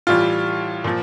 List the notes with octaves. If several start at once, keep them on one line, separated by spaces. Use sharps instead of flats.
A2 E3 G3 F4
A#2 F3